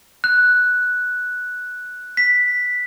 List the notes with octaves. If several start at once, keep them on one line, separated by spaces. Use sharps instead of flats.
F#6
B6